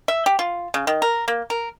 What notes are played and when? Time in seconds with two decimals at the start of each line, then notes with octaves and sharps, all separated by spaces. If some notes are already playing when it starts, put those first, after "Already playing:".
0.08 E5
0.26 G4
0.39 F4
0.74 C#3
0.87 D#3
1.02 A#4
1.28 A#3
1.50 A#4